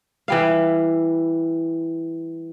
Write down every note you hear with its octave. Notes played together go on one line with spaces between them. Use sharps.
E3 G3 F5